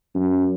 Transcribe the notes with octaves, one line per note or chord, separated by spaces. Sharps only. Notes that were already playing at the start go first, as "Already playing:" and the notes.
F#2